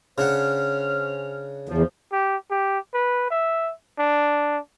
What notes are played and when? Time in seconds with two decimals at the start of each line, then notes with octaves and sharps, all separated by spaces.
0.18 C#3 C#4 D4 C5 F#5 F6
1.69 E2 F3
2.12 G4
2.50 G4
2.94 B4
3.30 E5
3.99 D4